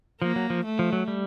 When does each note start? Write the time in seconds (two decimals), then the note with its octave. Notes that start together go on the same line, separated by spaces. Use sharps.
0.21 F3 A#3
0.36 F#3
0.50 F3
0.65 A3
0.79 F3
0.93 F#3
1.08 G3